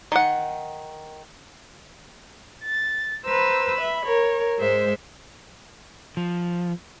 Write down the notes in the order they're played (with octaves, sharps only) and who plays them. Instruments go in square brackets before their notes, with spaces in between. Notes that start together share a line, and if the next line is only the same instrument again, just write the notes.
[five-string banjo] D#3 F#5
[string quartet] A6
B4 C5 A#5 E6
E5 B5
A#4 C#5
G#2 G#3 C5 E5
[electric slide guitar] F3